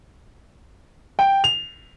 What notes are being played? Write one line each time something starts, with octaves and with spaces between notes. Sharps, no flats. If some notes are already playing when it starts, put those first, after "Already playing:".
G5
F7